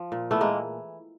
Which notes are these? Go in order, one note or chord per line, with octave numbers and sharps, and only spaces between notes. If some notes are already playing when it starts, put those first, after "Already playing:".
Already playing: F3
A#2
E3 A3 B3
G#3 A#3